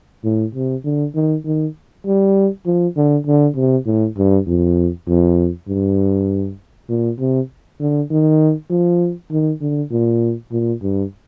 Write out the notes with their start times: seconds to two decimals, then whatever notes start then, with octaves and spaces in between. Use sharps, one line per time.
0.24 A2
0.55 C3
0.85 D3
1.15 D#3
1.45 D#3
2.06 G3
2.66 F3
2.97 D3
3.27 D3
3.56 C3
3.86 A2
4.17 G2
4.47 F2
5.07 F2
5.68 G2
6.89 A#2
7.19 C3
7.80 D3
8.11 D#3
8.70 F3
9.31 D#3
9.61 D3
9.91 A#2
10.52 A#2
10.83 G2